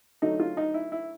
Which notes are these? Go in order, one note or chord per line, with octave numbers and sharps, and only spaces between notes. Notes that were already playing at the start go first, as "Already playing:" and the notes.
D3 F#3 A3 D#4
F4
D#4
E4
E4